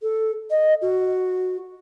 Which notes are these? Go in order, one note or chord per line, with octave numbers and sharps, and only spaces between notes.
A4
D#5
F#4